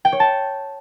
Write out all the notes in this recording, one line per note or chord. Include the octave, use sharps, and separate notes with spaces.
G5
C#5
A5